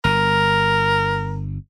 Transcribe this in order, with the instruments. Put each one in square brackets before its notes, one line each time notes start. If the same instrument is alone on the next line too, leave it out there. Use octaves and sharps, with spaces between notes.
[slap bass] G1 [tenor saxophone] A#4